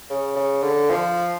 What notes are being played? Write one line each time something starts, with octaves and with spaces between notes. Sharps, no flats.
C#3
C#3
D3
F3